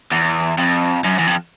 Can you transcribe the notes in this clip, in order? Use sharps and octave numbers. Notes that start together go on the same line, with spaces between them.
E2
F2
F#2
E2
F2